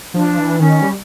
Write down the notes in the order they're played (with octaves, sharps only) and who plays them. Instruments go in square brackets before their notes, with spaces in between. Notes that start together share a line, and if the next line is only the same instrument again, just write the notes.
[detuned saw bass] F3 [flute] D4
[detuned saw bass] E3
[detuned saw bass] D#3 [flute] C#4
[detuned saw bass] G3